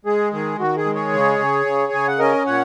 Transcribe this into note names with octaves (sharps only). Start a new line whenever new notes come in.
G#3 G#4
D#3 G#4
D#3 F#4
G#4
G#3
G#4 C#5
C#3
C#3
C#3
C#3 G#5
F#5
C#4 A#4 D#5
A#2 C#5 F#5